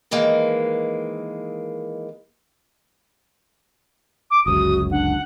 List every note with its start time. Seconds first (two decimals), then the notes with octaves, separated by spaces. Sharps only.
0.11 D#3 E3 G#3 A#3
4.31 D6
4.46 G1 C#2 F#2 F#4 D#6
4.91 D4 F#5